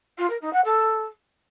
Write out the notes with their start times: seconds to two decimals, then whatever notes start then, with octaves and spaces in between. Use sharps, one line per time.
0.18 F4
0.30 A#4
0.41 D#4
0.53 F#5
0.65 A4